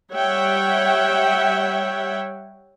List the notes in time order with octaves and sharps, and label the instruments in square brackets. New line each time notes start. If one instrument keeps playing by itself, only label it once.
[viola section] G3 C#5 E5 F#5 G5